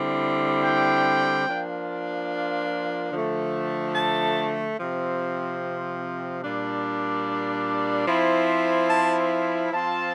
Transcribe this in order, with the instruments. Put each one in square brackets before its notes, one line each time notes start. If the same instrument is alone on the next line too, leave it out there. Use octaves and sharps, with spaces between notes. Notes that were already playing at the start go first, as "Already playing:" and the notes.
Already playing: [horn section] D3 G3 C4 E4
G5
F3 A#3 D4 F4
D3 F3 A3
A5
C3 F3 C4
A#2 G3 D4
F3 C4 E4
A5
F3 C4 F4 A5